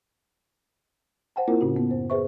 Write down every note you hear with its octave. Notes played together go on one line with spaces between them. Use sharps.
C5 F#5 G5 A5
A#3 C4 E4 F4 A#4
A2 C#3 C#4 F#4
B3
F#2 C5
G#4 B4 C5 E5 C#6